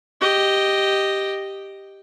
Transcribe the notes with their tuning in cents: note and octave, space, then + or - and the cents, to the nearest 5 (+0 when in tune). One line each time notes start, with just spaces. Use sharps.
G4 +0 D#5 +0